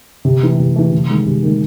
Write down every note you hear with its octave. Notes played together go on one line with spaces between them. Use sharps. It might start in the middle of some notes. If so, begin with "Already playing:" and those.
C3
E3 A3
C3
E3 A3
C3
D#3 G#3
C3
D#3 G#3